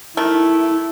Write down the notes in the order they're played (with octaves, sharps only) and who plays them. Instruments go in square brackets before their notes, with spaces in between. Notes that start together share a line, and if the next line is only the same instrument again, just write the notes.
[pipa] D#3 A3 A#4 [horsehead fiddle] E4